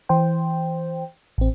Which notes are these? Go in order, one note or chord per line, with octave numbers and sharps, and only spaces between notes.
E3 C5 G5
A1 C4